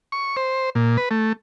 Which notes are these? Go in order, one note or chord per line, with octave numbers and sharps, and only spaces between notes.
C#6
C5
A#2
B4
A3